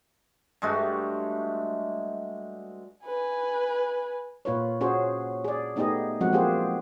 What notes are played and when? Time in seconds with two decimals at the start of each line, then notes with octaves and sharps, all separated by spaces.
0.62 G2 G#3 A3 F#4
3.05 B4 G#5
4.45 A#2 F4 B4 C#5
4.81 C#4 F#4 G#4 C5 C#5
5.45 G#4 D5
5.76 A3 B3 D#4 G4 G#4 D#5
6.21 F3 F#3 G#3 C4 F#4 F#5
6.32 A#3 F4 G4 G#4 C5